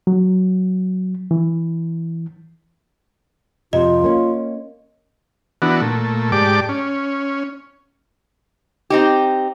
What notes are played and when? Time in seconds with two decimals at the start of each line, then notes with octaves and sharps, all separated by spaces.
0.07 F#3
1.31 E3
3.73 F2 C3 F4 D#5
4.04 A#3 C#4
5.62 E3 B3 D4 F#4
5.81 A#2 A3
6.32 G#2 G4 D5 A5 D6
6.69 C#4
8.90 C4 D#4 G4